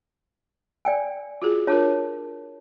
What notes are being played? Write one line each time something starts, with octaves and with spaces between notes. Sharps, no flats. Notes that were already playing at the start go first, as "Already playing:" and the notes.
D5 G5 G#5
F4 F#4 G#4
D4 F4 A#4 C#5 A5